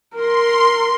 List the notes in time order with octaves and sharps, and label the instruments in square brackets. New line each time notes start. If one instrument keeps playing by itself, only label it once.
[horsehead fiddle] A#4 [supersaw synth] C6